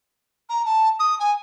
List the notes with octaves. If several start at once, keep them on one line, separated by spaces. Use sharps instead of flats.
A#5
A5
D#6
G#5